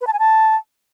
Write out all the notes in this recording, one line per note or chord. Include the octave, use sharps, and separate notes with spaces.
B4
A5
G#5
A5